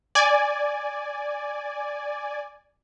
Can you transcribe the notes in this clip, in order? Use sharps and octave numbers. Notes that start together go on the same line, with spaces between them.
D5 G#5